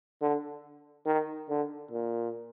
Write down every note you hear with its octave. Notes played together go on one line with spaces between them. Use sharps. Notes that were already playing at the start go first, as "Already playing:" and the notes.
D3
D#3
D3
A#2